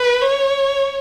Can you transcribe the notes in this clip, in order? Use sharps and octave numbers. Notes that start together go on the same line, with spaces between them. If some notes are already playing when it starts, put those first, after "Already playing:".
Already playing: B4
C#5